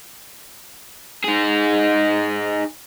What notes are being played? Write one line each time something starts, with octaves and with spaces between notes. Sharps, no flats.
D#4 G#4